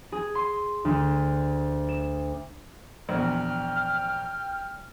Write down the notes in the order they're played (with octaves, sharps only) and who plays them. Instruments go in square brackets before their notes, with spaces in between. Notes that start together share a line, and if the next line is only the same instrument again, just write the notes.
[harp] G#4
C6
D2
E7
[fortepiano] A#1 E2 [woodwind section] G5 F6